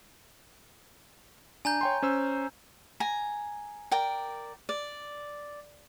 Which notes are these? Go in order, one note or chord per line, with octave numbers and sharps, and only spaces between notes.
D4 G#5 A#5 G6
C#5 G5 C6
C#4 C5 E6
G#5 A#5
A#4 D5 G5
D5